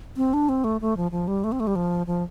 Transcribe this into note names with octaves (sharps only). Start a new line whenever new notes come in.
C4
D4
C4
A3
A3
F3
F3
G3
A3
C4
A3
G3
F3
F3